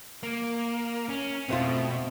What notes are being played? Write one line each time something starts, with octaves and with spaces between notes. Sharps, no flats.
A#3
C#4
F2 B2 A3 C4 F4